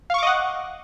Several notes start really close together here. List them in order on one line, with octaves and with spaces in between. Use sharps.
F5 C#6 D6 D#5 F#5